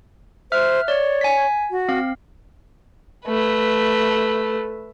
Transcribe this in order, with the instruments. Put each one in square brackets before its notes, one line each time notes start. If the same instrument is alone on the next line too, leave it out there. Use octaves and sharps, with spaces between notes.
[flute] C5 [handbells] E5 F6 F#6
[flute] C#5 [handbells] D5
[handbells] G#5 B6
[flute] F#4
[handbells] C4 F5
[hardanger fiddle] A3 B4